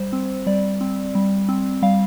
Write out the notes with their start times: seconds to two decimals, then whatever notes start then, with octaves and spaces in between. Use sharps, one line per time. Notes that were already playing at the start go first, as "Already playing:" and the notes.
Already playing: G3 C5
0.13 C4
0.46 G3 D5
0.81 C4
1.15 G3
1.49 C4
1.82 G3 F5